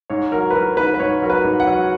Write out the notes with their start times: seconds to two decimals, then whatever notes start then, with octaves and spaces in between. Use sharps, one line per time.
0.10 G#2 C#5
0.32 F#3 A#4
0.50 B4
0.55 F#3 A#4
0.77 G#2 B4
0.94 B4
0.99 G#2 C#5
1.22 F#3 A#4
1.30 B4
1.44 G#2
1.60 F#5
1.67 F#3